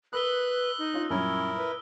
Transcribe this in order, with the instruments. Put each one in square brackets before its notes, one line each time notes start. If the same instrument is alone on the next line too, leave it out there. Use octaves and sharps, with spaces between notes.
[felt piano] A#4 B5 [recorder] B4 [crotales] D#6 E6 G7 [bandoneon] F#6
[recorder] D#4
[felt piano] C#4 F4
[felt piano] F#2 A#2 G3 [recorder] C#4 [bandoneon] E4 A#4
[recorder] B4